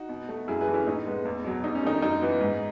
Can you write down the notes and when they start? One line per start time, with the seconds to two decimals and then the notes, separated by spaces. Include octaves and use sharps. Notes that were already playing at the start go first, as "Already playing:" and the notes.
Already playing: D#4 F#4
0.09 B2
0.29 A3
0.48 F#2 E4 G#4
0.61 G#4 B4
0.67 E3 A3
0.74 C#4 E4
0.87 A2 D#4
1.06 G#3 B3
1.25 E2
1.45 B2 F#3
1.64 E2 D#4
1.75 C#4
1.83 D#3 A3 D#4
2.02 F#2 D#4
2.21 E3 B3
2.41 G#2